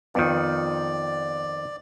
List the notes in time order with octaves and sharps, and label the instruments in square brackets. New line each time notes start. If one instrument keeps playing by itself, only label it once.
[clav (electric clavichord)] F2 D#3 [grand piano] B3 F4 [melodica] D5